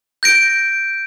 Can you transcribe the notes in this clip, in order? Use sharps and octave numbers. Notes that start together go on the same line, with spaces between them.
G6 A#6 D7